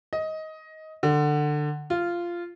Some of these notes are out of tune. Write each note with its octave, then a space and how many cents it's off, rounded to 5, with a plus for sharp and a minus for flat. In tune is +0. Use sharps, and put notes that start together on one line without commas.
D#5 +15
D3 +20
F4 -10